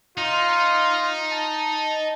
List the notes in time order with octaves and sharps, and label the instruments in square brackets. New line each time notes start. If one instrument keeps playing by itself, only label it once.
[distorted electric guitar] D#4 [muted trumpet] F4
[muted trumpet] A5